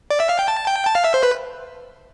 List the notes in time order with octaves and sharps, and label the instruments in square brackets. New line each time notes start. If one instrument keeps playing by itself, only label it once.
[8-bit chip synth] D5
E5
F5
G5
A5
G5
A5
F5
E5
C5
B4